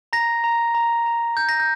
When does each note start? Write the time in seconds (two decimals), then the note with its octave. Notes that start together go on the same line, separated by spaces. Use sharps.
0.13 A#5 A#6
0.44 A#5
0.75 A#5
1.06 A#5
1.37 A#5 G6
1.49 A#6
1.60 G6